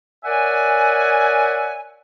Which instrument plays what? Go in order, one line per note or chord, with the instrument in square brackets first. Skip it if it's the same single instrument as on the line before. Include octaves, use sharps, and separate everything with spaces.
[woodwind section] A#4 C#5 D5 E5 F#5 G#5